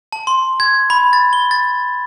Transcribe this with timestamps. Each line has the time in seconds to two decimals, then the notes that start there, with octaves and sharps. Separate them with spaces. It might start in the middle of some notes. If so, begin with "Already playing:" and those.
0.12 A5
0.27 C6
0.60 G#6
0.90 B5
1.13 A6
1.33 G7
1.51 A6